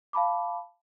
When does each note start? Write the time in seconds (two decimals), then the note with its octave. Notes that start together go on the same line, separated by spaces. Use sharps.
0.13 F5 A5 B5 D6